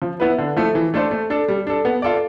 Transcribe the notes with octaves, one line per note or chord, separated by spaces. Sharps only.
F3
B3 E4 B4
D3
F3 A3 E4 A4
E3
A3 D4 A4 C5
A3
D4 A4
G3
D4 A4
B3
F4 A4 D5